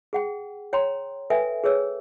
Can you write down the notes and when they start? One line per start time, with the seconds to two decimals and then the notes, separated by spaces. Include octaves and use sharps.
0.13 G#4 F#5 G5
0.73 C#5 G5 A#5 C6
1.30 A4 B4 E5 G5 G#5
1.64 G#4 B4 C#5 E6